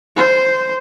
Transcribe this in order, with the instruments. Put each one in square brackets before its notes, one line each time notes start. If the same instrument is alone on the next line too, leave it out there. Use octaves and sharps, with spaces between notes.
[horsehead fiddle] C5